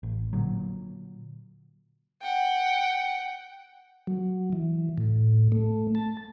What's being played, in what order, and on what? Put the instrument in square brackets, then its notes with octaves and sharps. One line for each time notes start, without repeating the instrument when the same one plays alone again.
[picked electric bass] A1
A#2 D3 F#3
[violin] F#5 G5
[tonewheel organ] F#3
E3
A2
A3
A5